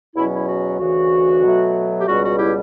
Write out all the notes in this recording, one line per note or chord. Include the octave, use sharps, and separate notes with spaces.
E2 B2 F#3 C#4 E4
E4
F#4
D2 C#3 E3 F#4
B2 F#3 A3
G4
C#2 B2 G3 F#4
F#4
E4 G4